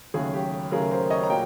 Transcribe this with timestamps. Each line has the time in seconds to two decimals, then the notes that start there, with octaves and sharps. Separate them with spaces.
0.14 D#2 C#3 F#3 A3 G#4
0.33 G4
0.71 D#2 C#3 F#3 A3 G#4 A#4
0.91 A#4 C5
1.10 C#5 D#5
1.23 A#5
1.30 A#2 F#3 G5